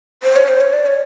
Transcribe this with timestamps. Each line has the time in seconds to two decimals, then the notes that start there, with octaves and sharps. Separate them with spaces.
0.23 C5
0.36 C#5
0.48 C5
0.61 C#5
0.73 D5
0.86 C#5